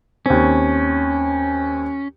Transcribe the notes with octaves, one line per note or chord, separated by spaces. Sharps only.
D#2 C4 C#4